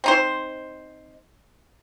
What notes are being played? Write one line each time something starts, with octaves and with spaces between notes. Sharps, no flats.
C4 D#4 C5